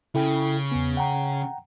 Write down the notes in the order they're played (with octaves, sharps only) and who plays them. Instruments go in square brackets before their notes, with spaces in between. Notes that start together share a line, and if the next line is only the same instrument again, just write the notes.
[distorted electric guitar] C#3 [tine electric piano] E4 A4 G5
[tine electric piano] E2 B3
F#5 G5 A#5